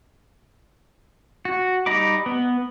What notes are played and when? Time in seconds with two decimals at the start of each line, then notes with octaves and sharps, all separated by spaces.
1.45 F#4
1.86 G3 D#4 D#5 B5 D6
2.26 B3